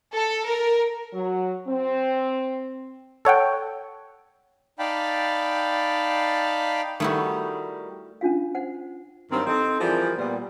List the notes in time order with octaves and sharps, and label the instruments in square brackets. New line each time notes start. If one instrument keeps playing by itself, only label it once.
[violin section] A4
A#4
[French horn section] F#3
C4
[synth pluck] A4 C#5 F#5 G5
[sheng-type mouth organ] D#4 D5 F5 G5 A5 B5
[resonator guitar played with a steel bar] D#3 G3 [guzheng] A3 E4 F#4
[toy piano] C#4 D4 F4 F5
C5 F#5
[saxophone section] G2 D#3 F#3 G3 C4
C4 D#4 A4
E3 F3 G3 G4 G#4 A#4
A#2 G3 B3